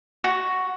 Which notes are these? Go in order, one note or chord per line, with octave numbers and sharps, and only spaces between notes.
F#4